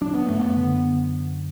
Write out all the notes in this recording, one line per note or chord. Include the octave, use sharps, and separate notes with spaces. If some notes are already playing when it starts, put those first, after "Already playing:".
F#3 D4
B3
F#2 A3
B3
D3